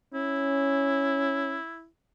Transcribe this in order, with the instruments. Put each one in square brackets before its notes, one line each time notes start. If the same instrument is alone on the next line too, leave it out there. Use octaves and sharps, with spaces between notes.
[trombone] C#4 [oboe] E4